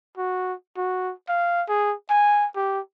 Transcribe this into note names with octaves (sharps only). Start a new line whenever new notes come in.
F#4
F#4
F5
G#4
G#5
G4